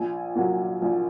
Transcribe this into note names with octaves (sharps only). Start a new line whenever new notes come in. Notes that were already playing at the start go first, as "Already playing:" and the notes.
Already playing: A#1 G#5
A#2 F#3
A#1